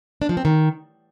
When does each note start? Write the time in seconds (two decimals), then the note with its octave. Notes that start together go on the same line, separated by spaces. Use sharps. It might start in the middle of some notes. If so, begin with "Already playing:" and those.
0.22 D4
0.29 F3
0.37 C4
0.45 D#3